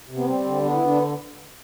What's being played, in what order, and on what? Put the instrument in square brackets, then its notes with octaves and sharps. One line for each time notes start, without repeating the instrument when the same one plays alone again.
[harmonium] C3
B3
G3 C4
D3
B3 D4
E4
D3 D4